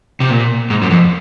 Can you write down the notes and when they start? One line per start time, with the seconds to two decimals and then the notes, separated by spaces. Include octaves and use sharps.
0.20 C3
0.30 A#2
0.70 G#2
0.82 F#2
0.91 F2